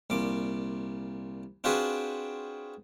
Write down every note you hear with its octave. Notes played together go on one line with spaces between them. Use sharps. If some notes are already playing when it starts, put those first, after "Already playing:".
C2 A#2 D6
C4 D4 F4 F#4 G#4 B4